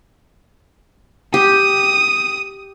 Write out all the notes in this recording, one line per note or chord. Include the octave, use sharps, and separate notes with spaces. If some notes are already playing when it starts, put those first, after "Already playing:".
G4 D#6